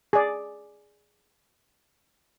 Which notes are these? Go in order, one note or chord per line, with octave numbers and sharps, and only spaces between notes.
G#4 D5